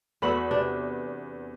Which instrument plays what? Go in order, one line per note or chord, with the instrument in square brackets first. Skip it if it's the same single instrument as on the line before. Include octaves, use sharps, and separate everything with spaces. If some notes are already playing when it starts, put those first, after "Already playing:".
[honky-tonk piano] E2 B5 F#7 [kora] A3 F#4 E5
[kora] C3 D4